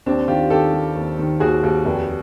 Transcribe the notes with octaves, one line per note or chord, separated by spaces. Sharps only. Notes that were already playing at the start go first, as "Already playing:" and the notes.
D#2 C4 D4
D#3 F4 G4
D#3 G4 A4
G3
D#2
D#3
D#2 F#4 G#4
D#2
F1